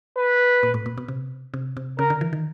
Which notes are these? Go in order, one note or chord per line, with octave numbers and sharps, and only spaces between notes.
B4
A#2
A2
A#2
B2
C3
C3
C3
C#3 A#4
D3
E3
D#3